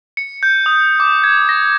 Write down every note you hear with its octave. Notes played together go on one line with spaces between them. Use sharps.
C#7
G6
D#6
D6
G#6
A#6